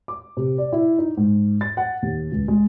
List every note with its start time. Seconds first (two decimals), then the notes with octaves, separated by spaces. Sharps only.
0.08 D6
0.37 C3
0.58 D5
0.73 E4
0.98 D#4
1.17 G#2
1.61 A6
1.77 F#5
2.02 D#2
2.32 C#2
2.48 G#3